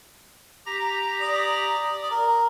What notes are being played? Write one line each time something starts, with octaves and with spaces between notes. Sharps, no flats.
G4 A#5 A#6
D5 D#6
A#4